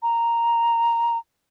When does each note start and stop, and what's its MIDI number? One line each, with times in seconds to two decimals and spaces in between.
0.03 1.18 82